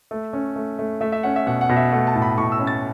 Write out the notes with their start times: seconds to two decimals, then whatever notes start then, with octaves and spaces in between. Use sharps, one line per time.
0.11 A3
0.33 C#4
0.56 A3
0.79 A3
1.01 A3 E5
1.12 E5
1.23 C#4 F#5
1.36 E5
1.47 B2 F#5
1.61 F#5
1.69 B2
1.76 E5
1.92 A3 F#5
2.07 A5
2.15 A2
2.22 B5
2.38 A2 C#6
2.52 E6
2.59 C#4
2.67 A6